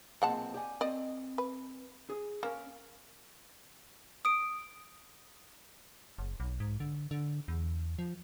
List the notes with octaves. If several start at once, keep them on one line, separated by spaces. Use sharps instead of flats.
B1 A#2 G#3 C4 F#5 A5
G4 D5 G#5
C4 D5 D#5
B4
G#4
A#3 C#4 A#4
D#6 D7
F#1
B1
G#2
D3
D3
E2
F3